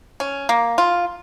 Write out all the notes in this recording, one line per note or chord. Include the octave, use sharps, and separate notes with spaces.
C#4
A#3
F4